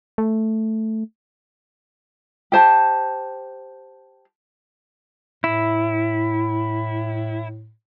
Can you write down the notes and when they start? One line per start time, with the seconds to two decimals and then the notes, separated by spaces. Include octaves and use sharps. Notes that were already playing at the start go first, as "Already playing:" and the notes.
0.18 A3
2.52 G4 C5 A5
5.44 A2 E4